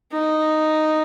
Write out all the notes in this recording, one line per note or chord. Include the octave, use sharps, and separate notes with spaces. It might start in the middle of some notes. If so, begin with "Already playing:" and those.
D#4